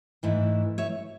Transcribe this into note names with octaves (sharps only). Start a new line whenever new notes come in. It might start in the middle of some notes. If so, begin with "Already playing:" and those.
G#2 E3 A3 E4
C#5 E5